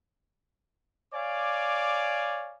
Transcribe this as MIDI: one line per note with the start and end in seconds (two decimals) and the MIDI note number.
1.14 2.57 73
1.14 2.57 74
1.14 2.57 77
1.14 2.57 80
1.14 2.57 86